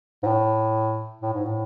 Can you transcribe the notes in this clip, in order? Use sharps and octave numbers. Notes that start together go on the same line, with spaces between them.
G#2
A2
A2
G#2
A2